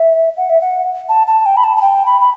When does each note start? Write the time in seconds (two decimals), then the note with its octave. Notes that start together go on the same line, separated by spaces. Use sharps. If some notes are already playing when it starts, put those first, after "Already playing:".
Already playing: E5
0.37 F#5
0.50 E5
0.61 F#5
1.09 A5
1.27 A5
1.46 G5
1.57 B5
1.64 A5
1.77 A5
1.81 G5
2.06 B5
2.21 B5